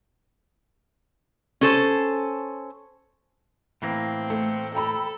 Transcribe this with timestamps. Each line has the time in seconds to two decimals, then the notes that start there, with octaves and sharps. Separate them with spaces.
1.61 C#4 A4 C5
3.82 A2 E3 A#3 C4
4.30 A3
4.75 A4 G5 A#5 B5